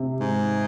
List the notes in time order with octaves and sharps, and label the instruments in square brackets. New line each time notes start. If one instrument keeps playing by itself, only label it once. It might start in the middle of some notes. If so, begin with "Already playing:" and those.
Already playing: [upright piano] C3
[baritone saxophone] G#2